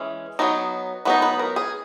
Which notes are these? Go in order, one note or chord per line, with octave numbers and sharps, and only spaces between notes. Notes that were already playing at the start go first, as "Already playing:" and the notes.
Already playing: E3 G#3 C#4
F#3 B3 D#4
F#3 B3 D#4 B4
B4
A#4
G#4